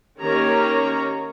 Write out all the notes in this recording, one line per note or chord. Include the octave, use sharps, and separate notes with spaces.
D#3 A#3 C#4 G4 C#5 A#5